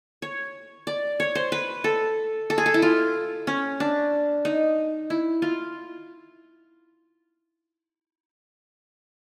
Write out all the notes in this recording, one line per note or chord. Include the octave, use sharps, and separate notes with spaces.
C#5
D5
C#5
C5
B4
A4
A4
G#4
A4
E4
F4
C#4
D4
D#4
E4
F4